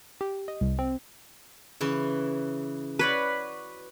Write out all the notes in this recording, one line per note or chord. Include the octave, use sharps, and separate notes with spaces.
G4
D#5
C2
C4
C#3 E3 B4
F#4 B4 C#5 D5